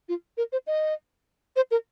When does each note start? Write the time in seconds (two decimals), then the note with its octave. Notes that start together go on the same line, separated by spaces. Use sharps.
0.09 F4
0.37 A#4
0.52 C5
0.67 D#5
1.56 C5
1.71 A#4